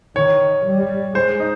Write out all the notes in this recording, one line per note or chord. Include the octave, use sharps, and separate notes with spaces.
D#3 C#5
G3
G#3 C5
D#4